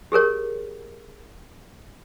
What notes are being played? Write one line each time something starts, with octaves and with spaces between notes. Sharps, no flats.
G4 G#4 A#4 C#5